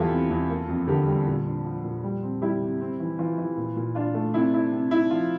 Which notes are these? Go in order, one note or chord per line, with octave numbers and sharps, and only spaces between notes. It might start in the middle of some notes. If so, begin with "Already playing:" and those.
Already playing: E2 E3 E4 F4 G4 A4
C3
E2
A#3
F2
D3 G4 A#4
G3
A#2
D4
F3
A#2
G3
C4
G3 E4 G4
C3
C4
E3
E3 F4
E3
A#2
A#2
D4 F4
A3
C3 E4
E4
C3
E4
F3 F4